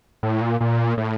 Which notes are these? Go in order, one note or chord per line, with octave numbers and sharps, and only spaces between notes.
A2
A#2
A#2
A2